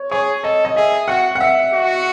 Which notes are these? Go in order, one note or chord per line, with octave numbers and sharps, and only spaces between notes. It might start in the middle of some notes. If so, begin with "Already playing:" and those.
Already playing: C#5
G#4 C#5
A4 D#5
D#5
G#4 E5
F#4 F#5
F#5
E5
F#4